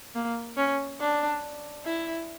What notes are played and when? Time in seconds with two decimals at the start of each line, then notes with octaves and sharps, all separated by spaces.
0.15 A#3
0.57 C#4
1.00 D4
1.85 E4